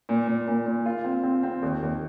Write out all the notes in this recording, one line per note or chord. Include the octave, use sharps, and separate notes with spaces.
A#2
A#2
A#2
A#2
F4
C4
C4
C4
D#2
D#2